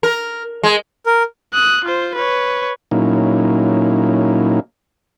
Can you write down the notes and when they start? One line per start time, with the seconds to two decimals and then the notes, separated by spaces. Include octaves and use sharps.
0.03 A#4
0.63 G#3
1.06 A#4
1.53 D#6 F#6
1.84 F4 C5
2.15 B4 C#5
2.91 A#2 F#3 A#3 C#4 D#4 E4